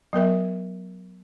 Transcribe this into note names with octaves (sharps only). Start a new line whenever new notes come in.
F#3 B3 A#4 E5